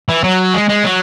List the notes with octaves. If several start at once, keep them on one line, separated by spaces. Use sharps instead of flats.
E3
F#3
G#3
G#3
F#3